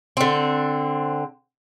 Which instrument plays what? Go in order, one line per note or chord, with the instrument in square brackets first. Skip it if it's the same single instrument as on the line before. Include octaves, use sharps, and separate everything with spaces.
[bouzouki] D3 C4